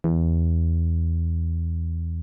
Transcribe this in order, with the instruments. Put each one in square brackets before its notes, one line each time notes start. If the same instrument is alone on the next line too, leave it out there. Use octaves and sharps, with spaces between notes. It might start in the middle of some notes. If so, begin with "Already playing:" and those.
[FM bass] E2